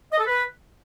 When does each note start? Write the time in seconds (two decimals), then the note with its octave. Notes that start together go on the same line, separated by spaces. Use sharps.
0.12 D#5
0.19 A4
0.26 B4